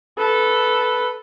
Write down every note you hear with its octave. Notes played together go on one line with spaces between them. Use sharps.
A4 B4